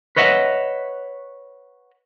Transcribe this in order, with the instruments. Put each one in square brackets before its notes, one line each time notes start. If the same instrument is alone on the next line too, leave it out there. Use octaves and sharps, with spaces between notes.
[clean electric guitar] B4 C#5 D#5 E5 F#5